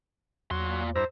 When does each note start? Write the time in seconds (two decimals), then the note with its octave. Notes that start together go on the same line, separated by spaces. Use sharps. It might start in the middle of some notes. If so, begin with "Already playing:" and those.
0.51 E2 A#2 F#3 C6
0.96 G2 E4 C5 A#5